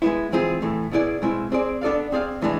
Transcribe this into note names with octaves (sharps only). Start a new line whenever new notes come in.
G#3 B3 E4
E3 G#3 C4 F4 G#4
A2 E3 A3
B2 B3 E4 G#4 D5
B2 G#3 C4 E4
C4 G#4 D5
B3 D4 A4 D5 F5
C4 G#4 D5 F5
A2 E3 G#3 D4